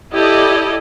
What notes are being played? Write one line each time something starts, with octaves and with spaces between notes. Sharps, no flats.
E4 G4 A4 D5 D#5